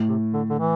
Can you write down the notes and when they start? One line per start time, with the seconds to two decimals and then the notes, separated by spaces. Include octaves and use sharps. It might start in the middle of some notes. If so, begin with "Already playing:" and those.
Already playing: A2
0.08 C3
0.33 D3
0.49 D3
0.59 E3